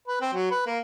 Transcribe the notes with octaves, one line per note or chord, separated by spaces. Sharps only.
B4
C4
F#3
B4
A#3